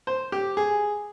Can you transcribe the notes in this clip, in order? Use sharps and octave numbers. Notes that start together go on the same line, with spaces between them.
C5
G4
G#4